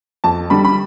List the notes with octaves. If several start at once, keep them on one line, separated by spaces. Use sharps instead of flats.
F2 A5
D3 G3 B5
B5